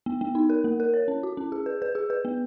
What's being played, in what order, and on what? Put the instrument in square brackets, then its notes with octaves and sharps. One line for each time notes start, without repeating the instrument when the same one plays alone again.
[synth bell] B3
B3
D#4
A#4
A#3
A#4
C#5
C#4
F#4
C#4
G#4
B4
B4
G#4
B4
B3